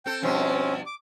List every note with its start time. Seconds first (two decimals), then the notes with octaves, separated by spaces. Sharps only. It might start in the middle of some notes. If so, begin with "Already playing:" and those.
0.06 C4 A4 G5
0.22 G2 B2 F3 C4 C#4
0.86 D6